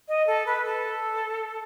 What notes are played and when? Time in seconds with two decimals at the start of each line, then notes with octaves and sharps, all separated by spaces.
0.08 D#5
0.27 A4
0.46 B4
0.65 A4